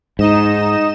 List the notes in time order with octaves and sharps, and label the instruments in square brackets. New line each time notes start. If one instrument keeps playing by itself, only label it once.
[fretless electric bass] G#2 [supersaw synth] D#4 D#5 E7